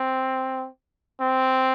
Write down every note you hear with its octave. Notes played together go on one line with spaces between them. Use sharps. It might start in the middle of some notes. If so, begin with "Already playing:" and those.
Already playing: C4
C4